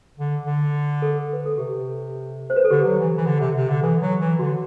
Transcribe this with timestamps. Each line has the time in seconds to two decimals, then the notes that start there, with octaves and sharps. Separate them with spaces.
0.18 D3
0.46 D3
1.02 A4
1.33 B4
1.46 A4
1.58 C3 G4
2.50 C5
2.56 B4
2.64 A4
2.71 D3 G4
2.85 F#3
2.99 E3
3.17 E3
3.26 D3
3.41 C3
3.56 C3
3.69 D3
3.83 E3 A4
4.02 F#3
4.21 E3
4.39 D3 F#4